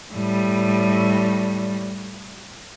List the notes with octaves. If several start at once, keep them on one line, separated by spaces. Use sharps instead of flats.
A2 G3